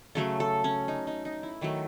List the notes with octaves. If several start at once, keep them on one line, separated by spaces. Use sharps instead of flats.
C#3 F#3 A3 A4
A4
C#4
D#4
D#4
D#4
E4
D#3 F#3 A3